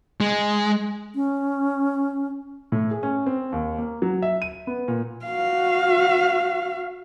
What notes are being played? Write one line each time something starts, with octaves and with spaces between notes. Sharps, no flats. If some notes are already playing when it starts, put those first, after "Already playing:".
G#3
C#4
A2
G#4
C#4
C4
D#2
A#3
F#3
E5
D#7
B3
A#2
F#4 F5